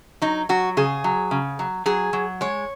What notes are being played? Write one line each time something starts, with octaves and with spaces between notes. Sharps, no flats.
F#3 D#4
F#3 F#4
C#3 G#4
F#3
C#3
F#3
F#3 G#4
F#3
G#3 C#5